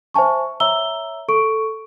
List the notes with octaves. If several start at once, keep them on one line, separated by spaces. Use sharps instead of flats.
C5 E5 G#5 A5 C#6
C#5 E5 A#5 E6 G7
A4 C#6 D7